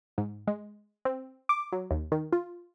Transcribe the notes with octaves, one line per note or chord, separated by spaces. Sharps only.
G#2
G#3
C4
D6
F#3
D#2
D#3
F4